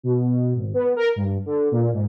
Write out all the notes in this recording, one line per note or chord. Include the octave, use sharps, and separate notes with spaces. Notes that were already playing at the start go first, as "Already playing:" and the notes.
B2
G#1
B3
A#4
G2
D3
A#2
G#2